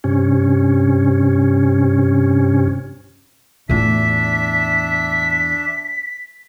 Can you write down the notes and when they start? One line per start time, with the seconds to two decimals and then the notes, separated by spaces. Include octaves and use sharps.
0.04 G2 C3 C#4
3.69 E2 A2 D4 F4 E5 B6